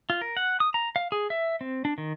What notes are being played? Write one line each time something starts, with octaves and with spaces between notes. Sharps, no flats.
F4
A#4
F#5
D#6
A#5
F5
G#4
E5
C4
D4
D#3